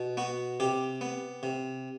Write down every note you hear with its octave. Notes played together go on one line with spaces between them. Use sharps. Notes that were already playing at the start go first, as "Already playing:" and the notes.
Already playing: B2
B3 F#4
C3 G4
B3
C3